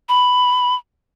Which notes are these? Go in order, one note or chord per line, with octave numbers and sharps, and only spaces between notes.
B5